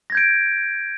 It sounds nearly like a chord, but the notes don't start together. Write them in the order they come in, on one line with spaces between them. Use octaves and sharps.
A#6 G#6 G6 D7